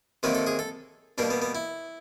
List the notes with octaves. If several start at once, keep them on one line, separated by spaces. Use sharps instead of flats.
C3 D#3 F#3 A#3 B4
A4
G#4
A4
B2 G3 A#3 D4
B3
B3
E4